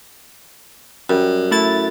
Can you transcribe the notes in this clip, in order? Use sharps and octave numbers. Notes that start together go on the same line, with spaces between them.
F#2 G3
A3 E4 A6